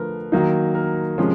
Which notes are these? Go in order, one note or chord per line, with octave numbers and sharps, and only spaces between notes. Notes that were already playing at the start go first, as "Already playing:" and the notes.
Already playing: D3 F3 A3 A#4 B4
D#3 F#3 A#3 D#4
A#4
C3 F3 G#3 C#4